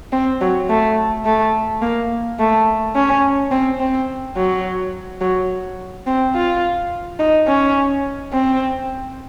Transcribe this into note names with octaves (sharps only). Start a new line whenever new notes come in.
C4
F#3
A3
A3
A#3
A3
C#4
C4
C4
F#3
F#3
C4
F4
D#4
C#4
C4